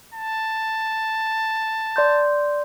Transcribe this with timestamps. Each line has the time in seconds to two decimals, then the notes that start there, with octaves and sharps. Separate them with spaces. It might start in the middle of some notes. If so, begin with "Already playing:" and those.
0.14 A5
1.96 D5 C6 G6